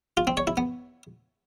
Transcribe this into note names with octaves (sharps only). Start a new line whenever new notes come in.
F4
C4
C#5
E4
B3